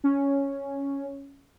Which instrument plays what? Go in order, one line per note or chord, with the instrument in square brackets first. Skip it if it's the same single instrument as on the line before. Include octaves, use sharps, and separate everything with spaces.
[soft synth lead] C#4